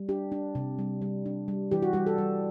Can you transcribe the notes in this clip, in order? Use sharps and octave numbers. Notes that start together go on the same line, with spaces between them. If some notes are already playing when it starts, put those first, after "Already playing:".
Already playing: G3
D4 G4
D4
C3
G3
G3
D4
G3
E3 G4
F#4
G3 G4
A4
G3